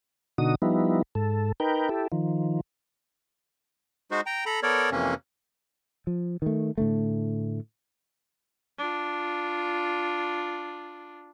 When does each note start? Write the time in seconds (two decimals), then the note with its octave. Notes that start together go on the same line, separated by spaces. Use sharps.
0.38 B2 D3 D#4 F#4 D#6
0.62 F3 G3 B3 D#4 E4
1.15 G#2 A4
1.60 D#4 A#4 B4 G5
1.89 E4 G4 A4
2.12 D#3 F3
4.11 G#3 D#4 F#4 C5
4.26 G5 A#5
4.46 A4 A#5 B5
4.63 B3 A4 A#4 C#5 D5
4.91 F2 C3 E3 A#3 C#4
6.07 F3
6.42 D#3 A3
6.78 A2 D3 A3
8.78 D4 F4